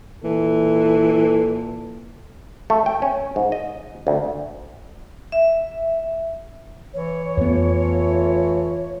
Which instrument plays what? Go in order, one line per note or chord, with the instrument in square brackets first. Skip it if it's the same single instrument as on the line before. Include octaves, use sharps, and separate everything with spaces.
[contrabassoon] A#2 [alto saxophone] E3 [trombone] A4
[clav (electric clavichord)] A3
G5
C#4
G#2
D#5
D2
[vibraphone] E5
[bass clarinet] E3 [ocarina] C#5
[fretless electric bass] F2 B3 [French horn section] A3 F4